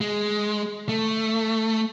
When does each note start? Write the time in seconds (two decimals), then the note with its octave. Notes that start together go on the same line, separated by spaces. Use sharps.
0.01 G#3
0.89 A3